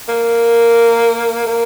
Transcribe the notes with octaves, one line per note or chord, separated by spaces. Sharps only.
A#3
A#3